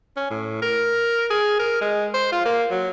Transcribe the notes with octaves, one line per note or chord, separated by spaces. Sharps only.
C#4
A2
A#4
G#4
A#4
G#3
C5
F4
A#3
F#3